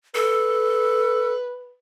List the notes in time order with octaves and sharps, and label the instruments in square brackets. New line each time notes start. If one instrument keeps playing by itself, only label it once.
[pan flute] A4 [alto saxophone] B4